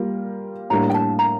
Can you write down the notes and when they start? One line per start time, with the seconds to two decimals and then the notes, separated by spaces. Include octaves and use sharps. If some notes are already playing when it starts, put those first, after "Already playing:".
Already playing: G3 A#3 F4
0.70 A2 G3 A#3 D4 A#5
0.90 G5
0.94 A5
1.19 A#5